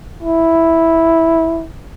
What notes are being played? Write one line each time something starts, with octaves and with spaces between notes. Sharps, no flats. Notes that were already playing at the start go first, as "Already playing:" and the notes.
E4